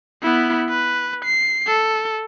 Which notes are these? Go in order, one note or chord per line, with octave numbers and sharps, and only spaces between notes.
B3 E4
B4
C7
A4